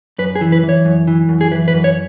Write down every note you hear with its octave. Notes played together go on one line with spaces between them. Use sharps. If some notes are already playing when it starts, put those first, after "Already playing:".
F#2 B4
G#4
E3
B4
E3
C#5
F#2
E3
F#2
G#4
E3 B4
B4
F#2
C#5